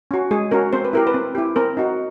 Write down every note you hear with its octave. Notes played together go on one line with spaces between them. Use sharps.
C#4 F#4
G#3 G#4
C#4 F#4 A#4
C4 C5
B4
E4 G4 A#4
B4
C4
E4 G4
C4 A#4
D#4 F#4